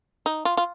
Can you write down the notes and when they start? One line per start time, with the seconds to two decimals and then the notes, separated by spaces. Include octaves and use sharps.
0.26 D#4
0.45 F4
0.57 F4